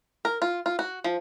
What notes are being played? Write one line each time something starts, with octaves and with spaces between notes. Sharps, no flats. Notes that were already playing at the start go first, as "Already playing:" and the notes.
A#4
F4
F4
F#4
F3